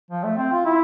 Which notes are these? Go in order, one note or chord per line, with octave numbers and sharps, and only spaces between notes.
F3
A3
C4
F4
E4